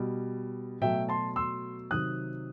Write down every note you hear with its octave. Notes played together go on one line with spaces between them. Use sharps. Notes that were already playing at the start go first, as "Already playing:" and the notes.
Already playing: B2 G3
B2 F#3 A3 E5 G5
A5 C6
C6 E6
C3 D#3 F#3 D#6 F#6